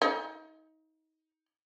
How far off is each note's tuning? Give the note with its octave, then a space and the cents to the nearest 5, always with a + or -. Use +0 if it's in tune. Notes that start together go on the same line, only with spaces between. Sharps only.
D#4 +30